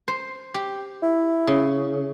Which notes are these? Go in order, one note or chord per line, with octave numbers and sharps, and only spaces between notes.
C5
G4
E4
C#3